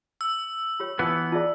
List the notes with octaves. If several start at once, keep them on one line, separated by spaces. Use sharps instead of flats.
E6
F4 G4 C#5
E3 B3 F4 A5 D#6
F4 G#4 D5 E5 A5